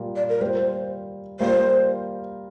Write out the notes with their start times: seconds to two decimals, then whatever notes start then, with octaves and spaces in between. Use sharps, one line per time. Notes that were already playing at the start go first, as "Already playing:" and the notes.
Already playing: A#2 G3 A#3 F4
0.16 D5
0.29 A#4
0.41 G3 A#3 F4 C5
1.40 G3 A#3 F4 C5